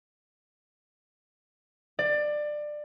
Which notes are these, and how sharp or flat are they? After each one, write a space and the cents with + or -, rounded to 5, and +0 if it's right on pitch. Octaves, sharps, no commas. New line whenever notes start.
D5 +20